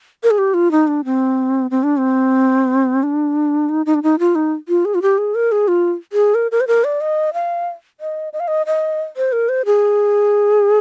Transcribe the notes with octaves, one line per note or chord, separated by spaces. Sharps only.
A#4
G#4
G4
F4
D#4
D4
C4
C4
D4
C4
D4
D#4
D#4
D4
D#4
F4
D#4
F4
G#4
F4
G4
G#4
A#4
G#4
F4
G#4
A#4
A#4
C5
A#4
D5
D#5
F5
D#5
D#5
F5
D#5
D#5
C5
A#4
C5
G#4